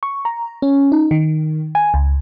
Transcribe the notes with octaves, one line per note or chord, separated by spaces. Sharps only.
C#6
A#5
C#4
D#4
D#3
G#5
C#2